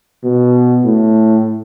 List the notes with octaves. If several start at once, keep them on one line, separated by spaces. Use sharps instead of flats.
B2
A2